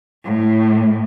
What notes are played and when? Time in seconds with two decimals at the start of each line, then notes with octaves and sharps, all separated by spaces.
0.24 A2